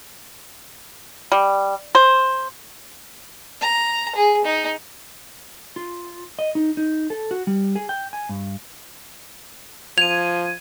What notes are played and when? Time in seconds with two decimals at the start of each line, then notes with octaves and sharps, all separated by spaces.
1.32 G3
1.95 C5
3.61 A#5
4.15 G#4
4.45 D#4
5.76 F4
6.39 D#5
6.55 D#4
6.77 D#4
7.10 A4
7.31 F#4
7.47 G3
7.75 G#4
7.89 G5
8.13 G#5
8.29 G2
9.98 F3 G#6 D#7 F7